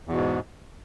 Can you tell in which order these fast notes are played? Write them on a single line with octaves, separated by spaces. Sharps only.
E2 B2 G#2